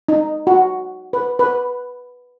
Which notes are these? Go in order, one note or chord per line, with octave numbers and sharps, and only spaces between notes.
D#4
F#4
B4
B4